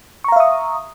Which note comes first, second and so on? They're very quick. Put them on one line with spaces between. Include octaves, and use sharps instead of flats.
C#6 A#5 F5 E5 D#6